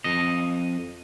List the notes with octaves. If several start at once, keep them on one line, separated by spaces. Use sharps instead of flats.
F2 D#5